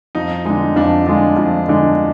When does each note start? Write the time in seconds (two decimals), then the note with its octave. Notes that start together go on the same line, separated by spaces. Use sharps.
0.15 F2 D#4
0.45 D3 G#3 D#4
0.76 F2 D4
1.06 D3 G#3 F4
1.37 F2
1.68 D3 G#3